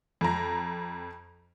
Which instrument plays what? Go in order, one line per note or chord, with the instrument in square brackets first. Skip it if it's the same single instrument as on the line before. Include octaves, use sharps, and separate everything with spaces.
[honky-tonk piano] F2 A#5